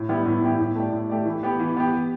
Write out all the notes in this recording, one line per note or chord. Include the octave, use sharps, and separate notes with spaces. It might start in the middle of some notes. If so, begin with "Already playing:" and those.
Already playing: A2
G3 B3 E4 G4
A2
G3 B3 E4 G4
A2
A3 G4 D5
A2
A3 G4 D5
E3
B3 G4
E3
B3 G4